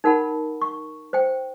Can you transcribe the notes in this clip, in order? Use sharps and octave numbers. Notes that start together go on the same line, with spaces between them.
D#4 A#4 F#5 A5 B5
C#6
C5 G5